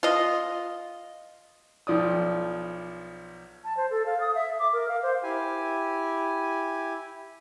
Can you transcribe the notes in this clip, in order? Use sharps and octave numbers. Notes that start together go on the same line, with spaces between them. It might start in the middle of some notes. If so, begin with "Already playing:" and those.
F4 D#5
B1 F3 D5 D#6
A5
C5
A4
F5
D#6
E5
D6
A#4
F5
C5
E4 G4 G#5